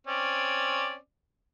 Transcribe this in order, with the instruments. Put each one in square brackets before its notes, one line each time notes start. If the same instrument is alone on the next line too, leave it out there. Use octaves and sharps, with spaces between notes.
[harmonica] C4 C#4 D5